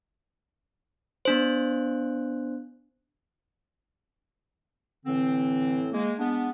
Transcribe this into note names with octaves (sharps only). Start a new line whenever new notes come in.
B3 D4 C5
A2 D3 E3 C4
G#3 A#3
G#3 B3 D4